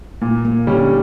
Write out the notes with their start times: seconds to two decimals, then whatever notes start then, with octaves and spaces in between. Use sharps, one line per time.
0.21 A#2 A#3
0.45 A#3
0.67 D3 G3 C#4